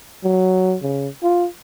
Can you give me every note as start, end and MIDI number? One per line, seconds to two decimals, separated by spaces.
0.24 0.76 54
0.82 1.08 49
1.23 1.47 65